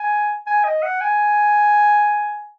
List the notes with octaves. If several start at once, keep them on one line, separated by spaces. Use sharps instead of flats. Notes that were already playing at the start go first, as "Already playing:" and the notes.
Already playing: G#5
G#5
D#5
F#5
G#5